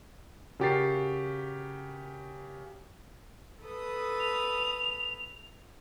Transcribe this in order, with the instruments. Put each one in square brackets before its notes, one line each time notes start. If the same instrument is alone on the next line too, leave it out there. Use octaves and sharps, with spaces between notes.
[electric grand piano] C#3 F#4 G4 A#4 A6 C7
[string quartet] A4 B4 D#6
[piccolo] F7